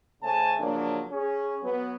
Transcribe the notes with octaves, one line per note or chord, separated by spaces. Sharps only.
C#3 A3 C5 G#5 A5
C#3 F3 F#3 A#3 D4
C#4 G#4
F#3 B3